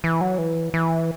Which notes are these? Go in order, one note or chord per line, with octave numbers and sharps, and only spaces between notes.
E3
F#3
E3
E3